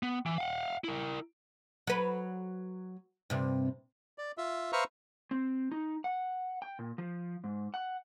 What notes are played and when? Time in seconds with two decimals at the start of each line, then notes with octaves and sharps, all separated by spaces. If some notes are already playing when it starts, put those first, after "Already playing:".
0.03 B3
0.26 E3
0.38 F5 F#5
0.84 E4 A#4
1.87 F#3 B4
3.30 G2 C3
4.18 D5
4.38 F4 E5
4.73 B4 C5 E5 F5 A#5 C#6
5.31 C4
5.72 D#4
6.04 F#5
6.62 G5
6.79 A#2
6.98 F3
7.44 G#2
7.74 F#5